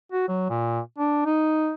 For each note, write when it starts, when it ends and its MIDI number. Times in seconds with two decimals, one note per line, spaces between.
0.12 0.26 66
0.28 0.48 54
0.50 0.80 46
0.98 1.25 62
1.26 1.73 63